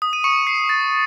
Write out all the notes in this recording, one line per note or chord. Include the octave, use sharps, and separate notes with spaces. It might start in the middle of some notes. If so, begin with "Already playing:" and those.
D#6
D#7
C#6 C#7
C7
A6